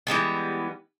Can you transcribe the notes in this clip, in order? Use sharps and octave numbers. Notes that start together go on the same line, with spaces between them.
E3 G3 G#3 B3